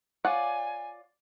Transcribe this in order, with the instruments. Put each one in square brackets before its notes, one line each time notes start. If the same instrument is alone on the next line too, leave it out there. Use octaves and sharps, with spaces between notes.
[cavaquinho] F4 D5 [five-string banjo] C#5 F#5 [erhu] G#5